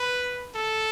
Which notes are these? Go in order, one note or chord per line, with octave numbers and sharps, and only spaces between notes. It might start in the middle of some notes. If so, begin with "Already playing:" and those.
Already playing: B4
A4